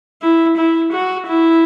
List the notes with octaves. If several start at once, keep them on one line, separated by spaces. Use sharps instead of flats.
E4
E4
F#4
E4